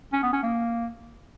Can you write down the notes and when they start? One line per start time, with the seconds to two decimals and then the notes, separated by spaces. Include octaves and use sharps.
0.13 C#4
0.23 B3
0.33 C#4
0.43 A#3